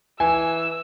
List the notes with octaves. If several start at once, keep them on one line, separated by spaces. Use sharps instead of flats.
E3 G#5 E6